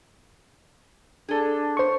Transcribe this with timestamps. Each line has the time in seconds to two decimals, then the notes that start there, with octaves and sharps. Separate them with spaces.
1.29 D4 G#4 A4
1.77 C5 C#6